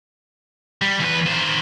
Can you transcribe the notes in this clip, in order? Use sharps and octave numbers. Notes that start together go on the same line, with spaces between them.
G3
E2 B4
D#3 C5